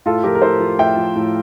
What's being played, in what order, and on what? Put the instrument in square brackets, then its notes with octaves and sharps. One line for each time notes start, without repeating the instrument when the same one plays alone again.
[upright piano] A2 F4 A4
F3 G4 A#4
A#4
A2 A4 C5
F3
A2 E5 G5
F3
A2